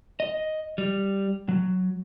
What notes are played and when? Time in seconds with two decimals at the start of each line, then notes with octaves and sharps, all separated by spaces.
0.20 D#5
0.78 G3
1.49 F#3